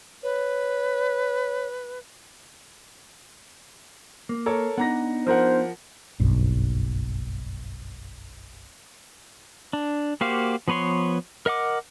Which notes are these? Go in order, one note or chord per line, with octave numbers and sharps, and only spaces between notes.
B4 C#5
A#3
A4 A#4 C#5
B3 D4 D#4 F#5 A#5 A#6
F3 A#4 C5 F#5
F#1 B1 G2
D4
A#3 F#4 G4 C5 F5
F3 B3 B4 C#5 C6
A#4 D#5 F#5 D6